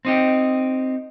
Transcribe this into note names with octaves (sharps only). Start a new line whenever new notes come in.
C4 D#4 G4